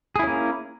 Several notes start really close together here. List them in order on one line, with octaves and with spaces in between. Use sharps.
G#4 E4 C#4 A#3